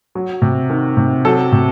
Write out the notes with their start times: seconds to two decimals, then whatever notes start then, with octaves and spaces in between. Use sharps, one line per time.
0.15 F#3
0.42 C3
0.70 D#3
0.97 C3
1.25 F#3 A4
1.52 C3